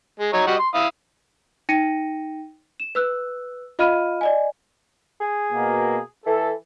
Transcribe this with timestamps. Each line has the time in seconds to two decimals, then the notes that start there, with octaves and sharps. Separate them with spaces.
0.20 G#3
0.33 F#3 D#4 C#5
0.47 G3 F#4 D#5
0.59 C6
0.74 E4 F5 D#6
1.69 D#4 G5 A#6 C#7 D#7
2.80 E7
2.95 B4 E6 F#6
3.79 F4 D#5 F5 B5 F6 D#7
4.21 D5 D#5 G#5
5.20 G#4
5.53 B2 A#3
6.26 E3 A4